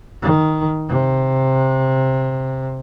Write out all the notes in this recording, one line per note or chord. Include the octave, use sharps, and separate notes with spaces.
D#3
C3